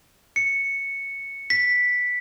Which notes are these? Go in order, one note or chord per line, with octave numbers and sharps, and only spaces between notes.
C#7
B6